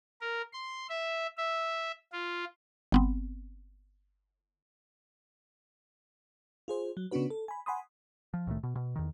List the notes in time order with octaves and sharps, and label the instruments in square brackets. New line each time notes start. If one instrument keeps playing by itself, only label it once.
[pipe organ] A#4
C6
E5
E5
F4
[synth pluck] G1 B3 C4
[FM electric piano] F4 G#4 C5
F#3
C#3 B3 C#4 D4 F#4 B4
A4
G#5 B5
F#5 G#5 B5 C6 D#6
[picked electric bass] F3
C2 A2 D#3 A3
B2
B2
E2 D#3